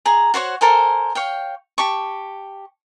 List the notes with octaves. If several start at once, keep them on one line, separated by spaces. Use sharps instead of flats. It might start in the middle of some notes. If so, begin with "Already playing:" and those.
G#4 G#5 A#5
F#4 C5 C#5 F#5
A4 A#4 C5 G#5
C#5 F5 G5
G4 A5 C#6